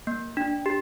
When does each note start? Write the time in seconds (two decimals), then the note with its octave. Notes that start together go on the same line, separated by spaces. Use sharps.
0.07 A#3
0.37 D4
0.66 G4